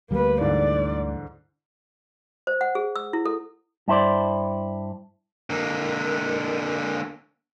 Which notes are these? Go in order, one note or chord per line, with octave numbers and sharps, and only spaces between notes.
D2 G3 A#3 B4
G#2 D3 E3 D5
C5
F#5
G#4
E6
E4
A4
G2 E4 C5 D5
D3 A#3